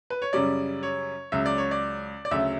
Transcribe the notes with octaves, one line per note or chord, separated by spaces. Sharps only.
B4
C#5
F#2 C#3 G3 C#4 D5
C#5
C#2 C#3 F#3 E5
D5
C#5
D5
D5
D2 C#3 F#3 E5